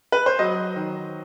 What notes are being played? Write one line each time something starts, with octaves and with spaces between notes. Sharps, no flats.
B4
C5
F#3 D#5
D#3